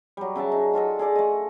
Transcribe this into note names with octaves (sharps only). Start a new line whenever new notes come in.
F#3 G3
C#3 E5 F#5 A5
D#4
D4 F4 A4 D#5
G#4 A4 D5 D#5
A3 D#5